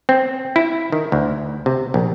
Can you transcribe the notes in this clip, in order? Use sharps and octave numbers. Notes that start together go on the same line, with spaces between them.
C4
E4
D#3
D2
C3
A#1